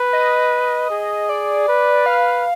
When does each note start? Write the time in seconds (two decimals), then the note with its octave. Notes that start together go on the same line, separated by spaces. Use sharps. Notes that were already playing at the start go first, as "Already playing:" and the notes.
Already playing: B4
0.13 D#5
0.90 G#4
1.29 D5
1.68 B4
2.06 F5